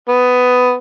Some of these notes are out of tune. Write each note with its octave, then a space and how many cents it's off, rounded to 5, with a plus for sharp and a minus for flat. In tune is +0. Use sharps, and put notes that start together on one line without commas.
B3 +15